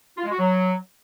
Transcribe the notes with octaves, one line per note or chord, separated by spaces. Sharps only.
F4
G#3
F#4
F#3